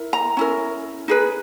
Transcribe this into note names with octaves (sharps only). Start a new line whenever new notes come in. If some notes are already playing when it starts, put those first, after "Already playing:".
Already playing: E4 A#4
A#5
C#4 E4 A#4
D#4 G#4 B4